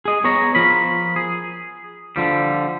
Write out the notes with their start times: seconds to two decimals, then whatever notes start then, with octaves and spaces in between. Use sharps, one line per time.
0.05 G#4 D#5
0.24 B3 G#4 C#5 G#5 A#5
0.55 F3 A#4 B5
1.16 G#4
2.16 D3 F3 G3